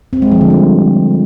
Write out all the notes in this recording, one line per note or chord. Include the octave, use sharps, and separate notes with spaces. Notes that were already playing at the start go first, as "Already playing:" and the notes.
C4
G#3
F3
D3
G3